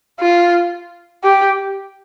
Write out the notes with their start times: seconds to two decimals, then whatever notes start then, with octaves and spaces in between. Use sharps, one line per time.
0.20 F4
1.24 G4